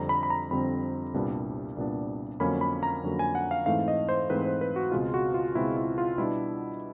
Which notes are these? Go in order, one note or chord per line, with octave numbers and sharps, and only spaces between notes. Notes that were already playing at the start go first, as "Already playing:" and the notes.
Already playing: F2 D3 G3 C4 A#5
B5
B5
A#5
F2 D3 G3 C4 B5
C2 A#2 G3 B3 D4
C2 A#2 G3 B3 D4
F2 D3 F#3 A#3 C#4 B5
B5
A#5
F2 D3 F#3 A#3 C#4
G#5
F#5
F5
G#2 E3 A3 C4 F5
D#5
C5
G#2 E3 A3 C4 B4
C5
B4
F#4
C#2 B2 G#3 C4 F4
F#4
F4
C#2 B2 G#3 C4 E4
E4
F4
B2 G3 B3 D4 E4